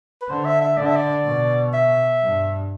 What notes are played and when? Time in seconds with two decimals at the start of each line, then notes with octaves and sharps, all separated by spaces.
0.22 B4
0.29 D3 C5
0.45 E5
0.61 E5
0.77 D3 D5
0.86 E5
0.96 D5
1.25 B2
1.74 E5
2.22 G2